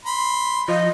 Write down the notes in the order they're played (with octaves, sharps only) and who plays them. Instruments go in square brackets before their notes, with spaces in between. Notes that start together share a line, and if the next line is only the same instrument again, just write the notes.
[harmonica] B5 C6
[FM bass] F3 [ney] D#5